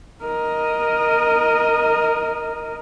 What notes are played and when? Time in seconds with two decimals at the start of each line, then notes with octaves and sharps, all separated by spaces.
0.24 A#4 D#5